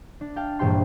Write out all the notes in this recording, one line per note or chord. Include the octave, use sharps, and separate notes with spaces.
D4
F5 G5 A5
E1 A#1 G2 G4 G5 C6